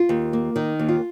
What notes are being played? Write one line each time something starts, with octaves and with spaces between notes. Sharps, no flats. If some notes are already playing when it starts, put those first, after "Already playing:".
Already playing: F4
D#2
A#3
D#3 D#4
D#2
F4